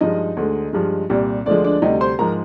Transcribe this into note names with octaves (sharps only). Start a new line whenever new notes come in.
G2 F3 G#3 D#4 D#5
D2 D3 G#3
G2 F3 G#3
C2 A#2 G3
D2 D3 F3 G#3 D4 D5
D4 D5
D2 C3 G3 D#4 D#5
C5 C6
G#2 F3 G#3 A#4 A#5